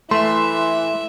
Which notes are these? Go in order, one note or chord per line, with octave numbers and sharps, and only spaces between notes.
E3 A3 E5 C6